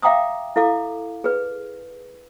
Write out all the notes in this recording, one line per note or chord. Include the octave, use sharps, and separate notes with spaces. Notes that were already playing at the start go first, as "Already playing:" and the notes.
E5 F5 G5 A#5 D6 D#6
E4 A4 F5 D6
G#4 B4